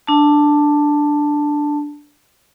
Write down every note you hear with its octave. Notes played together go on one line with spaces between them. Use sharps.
D4 A5